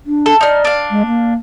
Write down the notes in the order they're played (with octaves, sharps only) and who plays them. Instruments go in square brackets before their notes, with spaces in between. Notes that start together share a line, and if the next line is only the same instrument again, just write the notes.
[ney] D4
[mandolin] A4
[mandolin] D#4 F6 [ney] D5
[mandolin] D4 F5
[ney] G#3
A#3